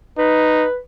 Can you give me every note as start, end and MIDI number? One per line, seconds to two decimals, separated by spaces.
0.18 0.66 63
0.18 0.77 71